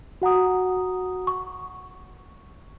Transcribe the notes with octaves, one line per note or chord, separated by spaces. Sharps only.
F#4 F#5 A#5 D#6
C#6